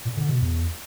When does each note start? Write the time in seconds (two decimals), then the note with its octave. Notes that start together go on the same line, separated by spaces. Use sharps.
0.05 A#2
0.17 D3
0.29 B2
0.41 E2